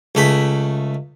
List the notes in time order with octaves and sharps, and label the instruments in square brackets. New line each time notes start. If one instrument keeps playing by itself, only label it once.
[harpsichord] C#2 A3 B5